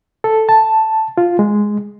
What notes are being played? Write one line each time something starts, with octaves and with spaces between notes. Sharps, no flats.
A4
A5
F4
G#3